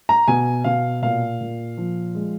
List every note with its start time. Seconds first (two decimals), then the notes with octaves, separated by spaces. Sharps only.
0.09 A#5
0.28 B2 G#5
0.64 B2 F5
1.02 A#2 F5
1.41 A#2
1.77 F3
2.15 G#3